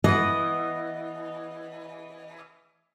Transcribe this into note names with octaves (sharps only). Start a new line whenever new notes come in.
E3 B3 D#5